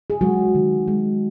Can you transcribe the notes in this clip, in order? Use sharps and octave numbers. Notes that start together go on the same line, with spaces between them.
G#4
F#3 G#3 F#4
D#3
G#3